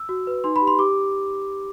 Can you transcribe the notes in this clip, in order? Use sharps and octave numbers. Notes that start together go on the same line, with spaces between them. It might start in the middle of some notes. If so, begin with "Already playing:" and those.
Already playing: E6
F#4
B4
D#4 C6
B5
G4
C6
G4 D6